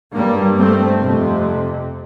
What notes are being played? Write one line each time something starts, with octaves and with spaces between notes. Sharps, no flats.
G2 G3 A#3
A3 C4
C3
F2